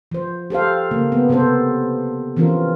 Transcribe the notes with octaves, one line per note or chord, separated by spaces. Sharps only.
F3 C5
G4 A4 C5 F5
C#3 A#3
B3
C3 B3 C4 A4 C5
E3 F3 C4 C#4 F4 A#4